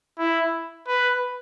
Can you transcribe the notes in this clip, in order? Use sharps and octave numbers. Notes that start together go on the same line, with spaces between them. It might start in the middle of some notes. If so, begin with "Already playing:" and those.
E4
B4